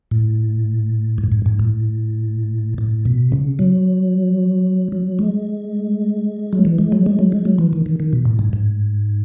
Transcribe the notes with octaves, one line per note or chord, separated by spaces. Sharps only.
A2
G#2
G#2
G#2
A2
A2
B2
C#3
F#3
F#3
G#3
F#3
E3
G#3
F#3
G#3
F#3
G#3
F#3
E3
D#3
D#3
D#3
B2
A2
G#2
G#2